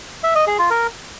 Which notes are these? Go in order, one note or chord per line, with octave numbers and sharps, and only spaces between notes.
E5
D#5
G#4
F4
A#4